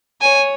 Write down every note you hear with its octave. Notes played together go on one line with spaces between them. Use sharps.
C#5 G#5